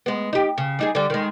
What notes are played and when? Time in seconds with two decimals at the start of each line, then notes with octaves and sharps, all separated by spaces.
0.06 G#3 B3
0.33 D#4 G4
0.58 C#3
0.79 G3 D#4 G#4
0.95 D3 G3
1.10 D#3 G#3